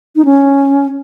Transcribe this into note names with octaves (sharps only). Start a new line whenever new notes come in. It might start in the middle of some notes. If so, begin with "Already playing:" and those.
D#4
C#4